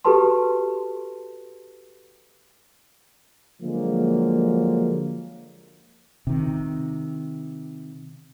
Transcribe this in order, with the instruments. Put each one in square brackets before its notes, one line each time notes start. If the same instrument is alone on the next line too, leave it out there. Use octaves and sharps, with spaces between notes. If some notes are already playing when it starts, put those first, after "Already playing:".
[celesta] F#4 G4 A4 B4 A5 C6
[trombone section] D3 F3 F#3 G#3 A#3
[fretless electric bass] C3 D#3